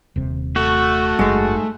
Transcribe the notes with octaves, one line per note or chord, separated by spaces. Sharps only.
D#1 C3
A3 F#4
F#1 G#2 G#3